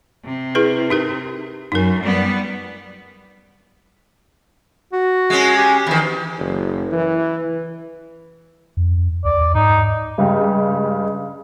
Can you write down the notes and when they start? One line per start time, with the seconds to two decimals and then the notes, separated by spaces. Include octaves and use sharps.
0.25 C3
0.55 E4 G#4 B4
0.90 D#4 G4 A#4
1.72 F#2 D#4 A#4
2.03 G3 B3
4.92 F#4
5.30 G#3 C#4
5.57 G4
5.87 E2 D#3
6.39 F#1
6.92 E3
8.77 F2
9.25 D2 D5
9.41 E2
9.55 G#2 D#4
10.18 G2 C#3 G#3 G4 F5